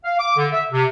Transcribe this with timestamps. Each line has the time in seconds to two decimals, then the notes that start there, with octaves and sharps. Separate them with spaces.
0.04 F5
0.19 D6
0.37 D3
0.53 E5
0.71 C3